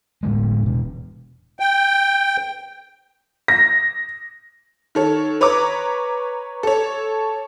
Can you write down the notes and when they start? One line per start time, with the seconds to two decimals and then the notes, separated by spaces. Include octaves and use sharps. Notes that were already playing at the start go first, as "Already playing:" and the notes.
0.23 A2 D3 G#3
0.63 E1 B2
1.60 G5
3.48 A#6
4.95 D#3 A4 C#5
5.41 B4 C#5 A#5 D6
6.63 A4 C#5